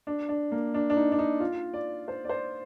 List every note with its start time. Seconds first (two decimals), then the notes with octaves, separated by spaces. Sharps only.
0.07 D4
0.29 D4
0.52 A#3
0.74 D4
0.90 D4
0.97 D#4
1.12 D4
1.19 D#4
1.40 F4
1.74 D5
2.08 C5
2.25 D5
2.29 C5